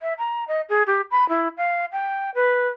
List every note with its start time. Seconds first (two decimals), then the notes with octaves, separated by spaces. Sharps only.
0.01 E5
0.18 A#5
0.48 D#5
0.69 G#4
0.87 G4
1.11 B5
1.29 E4
1.57 F5
1.92 G5
2.35 B4